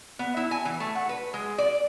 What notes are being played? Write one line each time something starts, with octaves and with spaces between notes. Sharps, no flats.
B3
E4
G#5
E3
A3
F#5
B4
G#3
D5